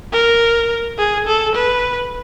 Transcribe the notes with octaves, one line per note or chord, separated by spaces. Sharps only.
A#4
G#4
A4
B4